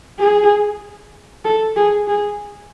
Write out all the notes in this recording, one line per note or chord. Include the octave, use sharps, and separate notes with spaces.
G#4
A4
G#4
G#4